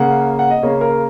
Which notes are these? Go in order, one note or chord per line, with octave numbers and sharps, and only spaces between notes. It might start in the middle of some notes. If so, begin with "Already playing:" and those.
Already playing: C#3 A#3 F#5
F#5
D#5
C#3 A#3 C#5
A#4